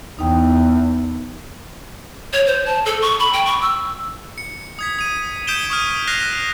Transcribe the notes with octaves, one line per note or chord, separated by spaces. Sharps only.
E2 D#4 G5
C#5
C5
A5
A4
C#6
B5
G5
C#6
E6
C#7
D#6 G#6 B6
D#6 D#7
D#6 G6 B6 D7 E7 G7
C#6 D#6 F6 D#7
F6 F#6 A#6 C7 F7